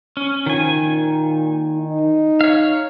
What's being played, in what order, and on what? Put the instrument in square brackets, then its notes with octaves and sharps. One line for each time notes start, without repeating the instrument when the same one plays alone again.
[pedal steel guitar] C#4
[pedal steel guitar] D#3 G#5 [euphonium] F3
[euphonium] A#2
D#4
[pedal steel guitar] C#5 F5